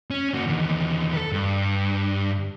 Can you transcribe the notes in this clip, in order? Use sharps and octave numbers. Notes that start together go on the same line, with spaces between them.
C#4
A#3 F#4
E2 D#3
A4 B4
G2